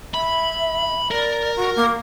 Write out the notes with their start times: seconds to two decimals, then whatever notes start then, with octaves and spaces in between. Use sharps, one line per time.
0.14 E5 B5
1.11 A#4 D5
1.56 F#4
1.76 A#3